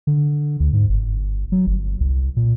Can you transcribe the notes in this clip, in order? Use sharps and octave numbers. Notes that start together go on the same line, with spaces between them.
D3
D2
G#2
G1
F#3
G1
C2
A#2